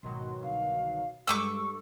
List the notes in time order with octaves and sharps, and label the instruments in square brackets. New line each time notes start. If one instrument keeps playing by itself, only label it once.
[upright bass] G#1 D#4 [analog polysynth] B2 D#3 F#3 [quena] C6
[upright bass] C2 D3 [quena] F5
[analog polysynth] G2 [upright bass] G3 G#3 [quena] A4 [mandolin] C#6 D6 E6